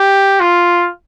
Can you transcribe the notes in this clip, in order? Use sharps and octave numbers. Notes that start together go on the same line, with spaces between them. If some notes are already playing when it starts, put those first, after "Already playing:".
Already playing: G4
F4